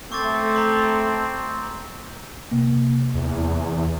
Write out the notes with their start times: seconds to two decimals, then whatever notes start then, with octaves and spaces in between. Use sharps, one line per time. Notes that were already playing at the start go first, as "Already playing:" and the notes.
0.12 A3 C4 C#6 D6 A6
0.54 A#5 C6 D6
2.51 C3 A#3
3.14 E2